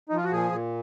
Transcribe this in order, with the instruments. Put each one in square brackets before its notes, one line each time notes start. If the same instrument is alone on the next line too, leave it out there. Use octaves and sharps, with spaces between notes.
[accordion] D#4
F3 F4
F#4
A#2 G#4
A#2